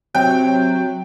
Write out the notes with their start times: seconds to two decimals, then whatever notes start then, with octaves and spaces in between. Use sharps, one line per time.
0.15 C3 F#3 G5